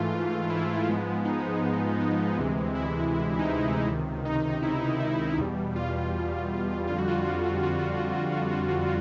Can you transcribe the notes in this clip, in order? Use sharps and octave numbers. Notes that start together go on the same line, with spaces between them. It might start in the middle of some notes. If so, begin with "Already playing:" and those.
Already playing: G#2 E3 A3 F4
E4
G#2 F3 G#3 B3
D#4
D#4
D2 C3 E3 G#3
E4
D#4
E4
C#2 C3 D#3
D#4
D#4
E4
D#4
E4
E2 B2 G3
F4
F4
F2 D3 G3 F4
F#4
F4
F#4